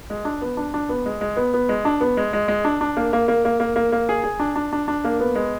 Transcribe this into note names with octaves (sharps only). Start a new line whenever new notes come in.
G#3
D4
B3
D4
D4
B3
G#3
G#3
B3
B3
G#3
D4
B3
G#3
G#3
G#3
D4
D4
A#3
A#3
A#3
A#3
A#3
A#3
A#3
G#4
G#4
D4
D4
D4
D4
A#3
B3
G#3